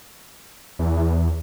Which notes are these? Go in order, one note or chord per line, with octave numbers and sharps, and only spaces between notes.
E2